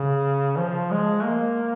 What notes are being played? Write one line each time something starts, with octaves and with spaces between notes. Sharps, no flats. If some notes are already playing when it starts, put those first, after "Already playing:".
Already playing: C#3
F3
G#3
A#3